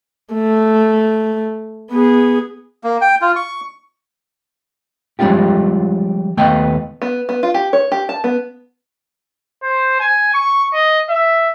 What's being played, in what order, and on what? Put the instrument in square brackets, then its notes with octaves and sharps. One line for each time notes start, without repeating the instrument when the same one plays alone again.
[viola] A3
B3 G#4
[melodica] A#3
G5
F4
C#6
[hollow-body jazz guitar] F3 G3 G#3 C#4 F4 G4
D#2 A3 B3 D#5 F5 G5
[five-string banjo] B3
B3
F4
G4
C#5
G4
A5
B3
[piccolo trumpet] C5
G#5
C#6
D#5
E5